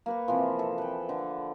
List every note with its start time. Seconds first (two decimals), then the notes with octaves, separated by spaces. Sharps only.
0.06 A#3 B4 C#6
0.28 C3 E3 F3
0.59 A4
0.78 B4 G5
1.09 D3